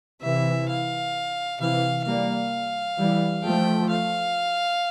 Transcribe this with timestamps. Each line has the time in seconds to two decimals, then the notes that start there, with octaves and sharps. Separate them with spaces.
0.22 C3 E3 E5
0.69 F5
1.60 C3 E3 F5
2.06 G3 A#3 F5
2.98 E3 G3
3.44 F3 A3 G5
3.90 F5